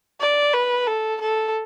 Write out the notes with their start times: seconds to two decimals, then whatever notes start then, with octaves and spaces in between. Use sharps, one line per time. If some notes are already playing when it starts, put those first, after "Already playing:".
0.21 D5
0.54 B4
0.87 A4
1.21 A4